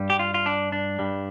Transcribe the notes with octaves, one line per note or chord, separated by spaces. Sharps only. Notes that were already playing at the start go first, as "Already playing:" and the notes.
Already playing: G2 G3
G4
F4
F4
D4
D4
G2 G3